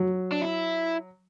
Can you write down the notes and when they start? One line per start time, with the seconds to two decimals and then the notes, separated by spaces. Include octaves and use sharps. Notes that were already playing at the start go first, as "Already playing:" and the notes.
Already playing: F#3
0.32 D4
0.42 E4